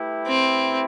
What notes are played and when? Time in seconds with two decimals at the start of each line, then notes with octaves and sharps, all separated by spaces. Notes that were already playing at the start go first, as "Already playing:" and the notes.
Already playing: A3 E4 G4 B4
0.27 C4